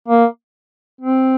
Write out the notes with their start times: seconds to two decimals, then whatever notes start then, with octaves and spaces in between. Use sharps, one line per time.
0.08 A#3
1.01 C4